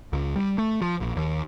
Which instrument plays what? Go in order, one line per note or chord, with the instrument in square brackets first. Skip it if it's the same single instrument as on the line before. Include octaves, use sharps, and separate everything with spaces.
[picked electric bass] C#2
G3
A3
F3
A#1
D#2